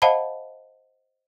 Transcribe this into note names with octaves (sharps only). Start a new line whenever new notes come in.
C5 D#5 F5 F#5 A5 B5